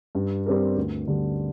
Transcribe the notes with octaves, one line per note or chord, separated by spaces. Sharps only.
G2
G3 C4 G4 A#4
D2
D3 G3